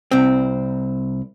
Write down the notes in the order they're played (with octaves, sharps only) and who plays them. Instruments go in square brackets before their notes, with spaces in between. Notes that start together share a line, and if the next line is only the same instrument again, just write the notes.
[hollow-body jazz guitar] C2 C4